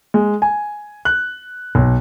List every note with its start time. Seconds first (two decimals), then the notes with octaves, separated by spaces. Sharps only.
0.14 G#3
0.42 G#5
1.05 F#6
1.75 B1